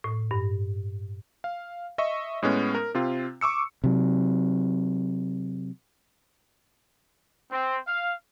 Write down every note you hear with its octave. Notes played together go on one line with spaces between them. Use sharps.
A2
G2
F5
D#5 E5 C#6
A2 G#3 B3 C#4
A#4
C3 C4 F4
C#6 D6 E6 C#7
C3 F#3
C4
F5